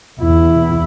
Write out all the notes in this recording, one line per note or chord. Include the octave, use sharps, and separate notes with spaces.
E2 E4